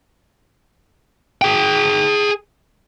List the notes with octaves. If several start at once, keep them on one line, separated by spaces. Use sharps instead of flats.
G#4 G5